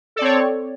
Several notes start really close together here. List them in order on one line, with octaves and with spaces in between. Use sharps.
A4 D5 C4 C#5